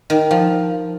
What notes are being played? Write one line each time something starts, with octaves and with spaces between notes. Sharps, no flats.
D#3
F3